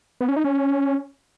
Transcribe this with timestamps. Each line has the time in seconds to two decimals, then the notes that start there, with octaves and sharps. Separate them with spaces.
0.21 B3
0.28 C#4
0.36 D#4
0.44 C#4